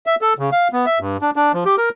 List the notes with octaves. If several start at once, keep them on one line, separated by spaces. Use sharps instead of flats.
E5
A4
C#3
F5
B3
E5
G2
D4
D4
F3
G4
A#4